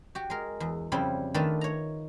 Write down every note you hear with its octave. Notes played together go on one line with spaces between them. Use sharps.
F#4 G4
G#3 A#4
E2
F2 C#3 G3 C4 E4
D#3 A3 D4 F4 A4 B4
C#5 A#5